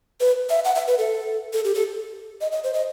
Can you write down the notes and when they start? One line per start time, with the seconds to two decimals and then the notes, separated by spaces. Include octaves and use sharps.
0.20 B4
0.50 E5
0.65 F#5
0.75 E5
0.87 B4
0.98 A4
1.53 A4
1.64 G4
1.75 A4
2.41 D#5
2.52 D#5
2.64 C5
2.74 D#5